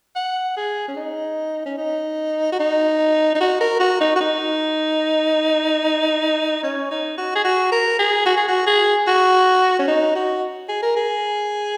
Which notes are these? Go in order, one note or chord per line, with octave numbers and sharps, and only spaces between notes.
F#5
G#4
C#4
D#4
C#4
D#4
F#4
D#4
D#4
F#4
A#4
F#4
D#4
F#4
D#4
C#4
D#4
F#4
G#4
F#4
A#4
G#4
F#4
G#4
F#4
G#4
F#4
C#4
D#4
F#4
G#4
A#4
G#4